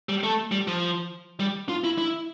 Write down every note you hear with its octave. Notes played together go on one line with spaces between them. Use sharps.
G3
A3
G3
F3
G3
F4
E4
E4